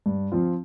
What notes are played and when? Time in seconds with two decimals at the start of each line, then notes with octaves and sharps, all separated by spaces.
0.06 G2
0.32 F3 C4 F4